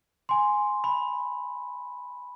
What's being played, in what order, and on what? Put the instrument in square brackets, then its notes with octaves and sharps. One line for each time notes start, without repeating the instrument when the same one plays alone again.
[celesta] G#5 C6
[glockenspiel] B5